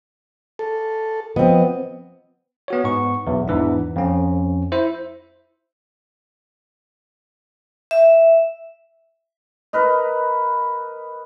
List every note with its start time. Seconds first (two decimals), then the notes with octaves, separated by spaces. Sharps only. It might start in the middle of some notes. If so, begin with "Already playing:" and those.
0.59 A4
1.36 F3 B3 C4 D#5
2.68 B3 F#4 C#5
2.84 G#2 B3 C#6
3.27 B1 E2
3.48 E2 G#2 E3 D4
3.96 F2 C#4
4.72 E4 C5 E5
7.91 E5
9.73 A#4 B4 D#5